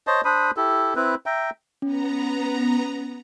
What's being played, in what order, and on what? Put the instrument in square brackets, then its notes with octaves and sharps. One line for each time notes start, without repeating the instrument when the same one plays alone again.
[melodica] C5 C#5 D#5 A5
D4 C5 B5 D#6
E4 G4 A4
C4 E4 B4
E5 G5 A#5
[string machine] B3 A#5 [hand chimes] C#4